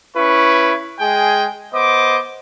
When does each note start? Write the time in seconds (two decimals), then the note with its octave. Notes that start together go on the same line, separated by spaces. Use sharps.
0.17 C#4 E4 B4 C#6
1.01 G#3 G#4 G5 G#5
1.74 B3 C5 D#5 D6